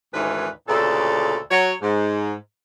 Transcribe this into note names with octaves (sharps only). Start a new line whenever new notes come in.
D2 G#2 D#3 E3 C#4 B4
D2 A#2 C#3 D4 A4
F#3 C#5
G#2